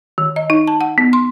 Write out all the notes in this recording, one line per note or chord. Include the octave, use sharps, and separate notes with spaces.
D#3
D#5
D#4
A5
F#5
B3
C6